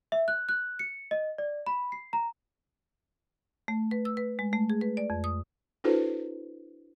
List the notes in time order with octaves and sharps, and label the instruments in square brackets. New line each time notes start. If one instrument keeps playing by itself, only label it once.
[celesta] E5
F#6
F#6
C#7
D#5
D5
B5
C7
A#5
[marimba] A3
B4
E6
B4
G#3
A3
G#4
B4
D5
F2
D#6
[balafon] D4 E4 F#4 A4 B4 C5